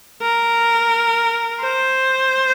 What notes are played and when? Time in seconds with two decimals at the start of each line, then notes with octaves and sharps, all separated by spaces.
0.22 A#4
1.61 C5